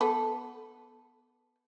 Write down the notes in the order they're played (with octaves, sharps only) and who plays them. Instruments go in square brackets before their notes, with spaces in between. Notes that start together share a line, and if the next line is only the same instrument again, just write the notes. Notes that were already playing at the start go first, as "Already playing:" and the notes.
[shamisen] B3 A4